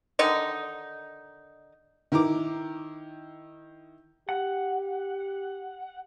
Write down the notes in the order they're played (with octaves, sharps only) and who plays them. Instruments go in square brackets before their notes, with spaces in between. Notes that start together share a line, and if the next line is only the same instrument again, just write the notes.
[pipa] D3 D#3 D#4 D#5
[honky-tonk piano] D#3 E4 A#5 D6
[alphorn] G4 [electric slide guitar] F#5